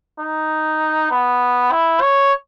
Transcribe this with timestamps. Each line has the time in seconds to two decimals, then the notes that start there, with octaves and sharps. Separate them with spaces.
0.20 D#4
1.11 B3
1.72 E4
2.01 C#5